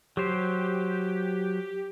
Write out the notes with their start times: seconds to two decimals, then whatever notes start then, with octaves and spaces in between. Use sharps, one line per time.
0.17 F#3 G4 C5